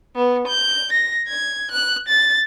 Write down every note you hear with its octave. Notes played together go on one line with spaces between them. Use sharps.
B3
G6
A#6
G#6
F#6
A6